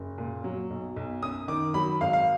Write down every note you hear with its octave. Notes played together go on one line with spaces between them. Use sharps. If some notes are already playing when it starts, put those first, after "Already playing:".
Already playing: F#1
A#2
F#3
B1
B1
F#2 D#6
D#3 D6
F#3 B5
G#1 F5
F5